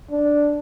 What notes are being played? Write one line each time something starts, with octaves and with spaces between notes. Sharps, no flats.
D4